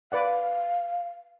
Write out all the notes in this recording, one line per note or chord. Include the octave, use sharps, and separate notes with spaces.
B4 D5 F5 F#5